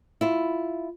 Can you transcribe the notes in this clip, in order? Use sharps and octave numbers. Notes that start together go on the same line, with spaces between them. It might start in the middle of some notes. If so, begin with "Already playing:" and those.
E4 F4